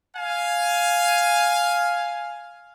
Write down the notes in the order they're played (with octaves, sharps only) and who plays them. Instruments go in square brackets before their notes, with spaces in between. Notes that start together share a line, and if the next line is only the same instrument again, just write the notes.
[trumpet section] F5 G#5